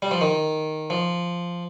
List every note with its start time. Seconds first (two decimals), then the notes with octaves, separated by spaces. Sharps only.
0.02 G3
0.11 F3
0.21 D#3
0.90 F3